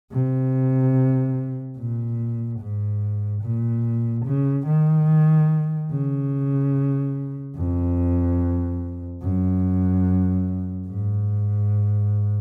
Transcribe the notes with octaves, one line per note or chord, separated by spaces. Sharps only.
C3
A#2
G#2
A#2
C#3
D#3
C#3
F2
F#2
G#2